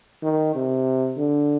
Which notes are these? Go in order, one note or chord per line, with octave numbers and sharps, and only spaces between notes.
D#3
C3
D3